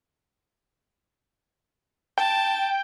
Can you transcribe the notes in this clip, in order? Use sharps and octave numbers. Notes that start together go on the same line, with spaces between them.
G5 A5